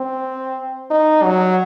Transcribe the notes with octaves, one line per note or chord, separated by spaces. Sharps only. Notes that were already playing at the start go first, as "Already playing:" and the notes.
Already playing: C4
D#4
F#3